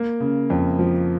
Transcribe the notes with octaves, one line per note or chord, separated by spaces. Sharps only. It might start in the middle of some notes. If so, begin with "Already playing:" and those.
Already playing: A#3
C#3
F2
F3